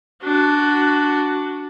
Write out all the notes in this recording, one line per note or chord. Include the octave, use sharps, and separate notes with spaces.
D4 F#4